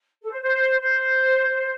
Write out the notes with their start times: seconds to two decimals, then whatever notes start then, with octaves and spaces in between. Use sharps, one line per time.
0.22 A4
0.31 C5
0.41 C5
0.80 C5